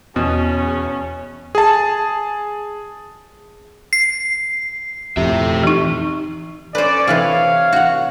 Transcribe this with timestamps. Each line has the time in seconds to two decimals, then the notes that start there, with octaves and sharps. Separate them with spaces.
0.16 E2 B2 C#4
1.55 G#4 A5
3.93 C7
5.17 F2 A2 G4 E5
5.63 E3 D#4
6.75 C#4 B4 C5 D5
7.07 C3 E3 B4 C#5 F5
7.72 F#4 F#5